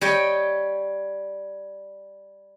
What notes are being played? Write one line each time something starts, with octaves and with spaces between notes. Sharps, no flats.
G3 C#5 D#5 G5